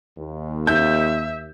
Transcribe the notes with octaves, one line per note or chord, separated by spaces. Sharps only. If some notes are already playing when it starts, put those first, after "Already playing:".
D#2
E5 G6